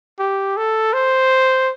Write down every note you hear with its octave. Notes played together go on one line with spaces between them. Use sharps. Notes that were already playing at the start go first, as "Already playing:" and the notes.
G4
A4
C5